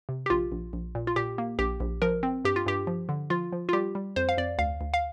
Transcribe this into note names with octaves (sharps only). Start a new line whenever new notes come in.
C3
G4
A#1 F4
A#1
A#1
A#2
F4
A#2 G4
A#3
A#1 G4
A#1
F3 A#4
C4
G2 G4
F4
G2 G4
F3
D3
F3 F4
F3
F4
G3 G4
G3
F2 C5
F5
F2 D5
D2 F5
D2
F5